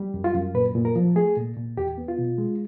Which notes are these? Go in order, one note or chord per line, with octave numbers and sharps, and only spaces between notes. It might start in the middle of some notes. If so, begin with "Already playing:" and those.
Already playing: G3
F#2
F4
F#2
A#2 B4
A#2
A#4
F3
A3 G#4
A#2
A#2
E2 G4
B3
F4
B2
G#3